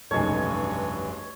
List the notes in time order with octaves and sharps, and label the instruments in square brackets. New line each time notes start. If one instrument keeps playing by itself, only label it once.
[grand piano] F1 B1 C#3 [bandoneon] G2 E3 [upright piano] G#3 A4 [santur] C#5